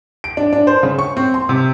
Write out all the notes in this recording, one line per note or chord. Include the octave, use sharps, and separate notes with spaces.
D7
D4
D4
C5
C#3
C#6
C4
C6
C3